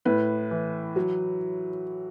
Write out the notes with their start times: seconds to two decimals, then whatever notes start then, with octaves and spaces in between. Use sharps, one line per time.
0.05 A2 B4
0.51 E3
0.96 F#3